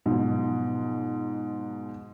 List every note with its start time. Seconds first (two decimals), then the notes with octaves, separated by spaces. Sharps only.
0.06 G#2 B2 F3 F#3